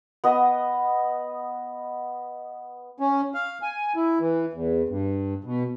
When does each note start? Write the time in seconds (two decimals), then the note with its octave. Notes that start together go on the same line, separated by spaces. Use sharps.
0.24 B3 D#5
3.00 C#4
3.34 F5
3.62 G#5
3.96 E4
4.20 E3
4.53 E2
4.89 G2
5.44 B2